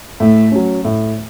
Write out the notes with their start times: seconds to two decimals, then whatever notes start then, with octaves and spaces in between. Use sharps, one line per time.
0.20 A2 A3
0.52 F#3 C#4
0.85 A2